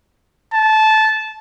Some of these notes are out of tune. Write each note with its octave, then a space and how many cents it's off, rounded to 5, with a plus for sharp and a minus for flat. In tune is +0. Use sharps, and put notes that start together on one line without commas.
A5 -15